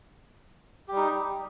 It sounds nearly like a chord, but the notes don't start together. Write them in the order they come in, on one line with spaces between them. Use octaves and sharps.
G4 G3 D#4